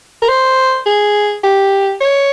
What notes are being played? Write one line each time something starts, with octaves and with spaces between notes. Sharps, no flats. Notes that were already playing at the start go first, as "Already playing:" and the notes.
A#4
C5
G#4
G4
C#5